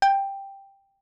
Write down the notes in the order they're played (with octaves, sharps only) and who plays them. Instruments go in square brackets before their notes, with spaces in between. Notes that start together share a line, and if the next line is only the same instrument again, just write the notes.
[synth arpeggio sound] G5